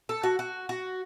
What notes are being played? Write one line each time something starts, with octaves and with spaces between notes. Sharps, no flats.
A4
F#4
F#4
F#4